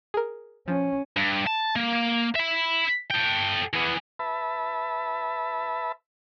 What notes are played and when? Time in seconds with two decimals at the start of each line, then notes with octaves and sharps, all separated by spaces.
0.14 G#4 A#4
0.68 F3 C#4
1.16 G2
1.47 A5
1.76 A#3
2.35 E5 B5
3.10 A4 G5
3.74 E3 B3
4.19 B4 E5 A5 B5